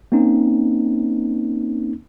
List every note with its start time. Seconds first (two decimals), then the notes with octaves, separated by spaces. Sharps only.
0.12 A#3 C4 C#4 D#4